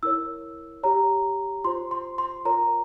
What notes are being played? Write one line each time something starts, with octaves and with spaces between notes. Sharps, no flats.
E4 A#4 C#5 E6
G4 C#5 A#5
F4 C5 C6
C6
C6
F4 A#4 C#5 A#5